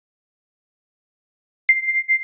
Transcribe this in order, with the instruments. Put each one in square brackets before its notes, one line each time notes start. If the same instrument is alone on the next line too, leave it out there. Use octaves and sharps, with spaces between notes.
[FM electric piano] C7